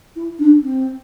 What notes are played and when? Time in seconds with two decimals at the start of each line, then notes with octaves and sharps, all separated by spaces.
0.15 E4
0.39 D4
0.62 C4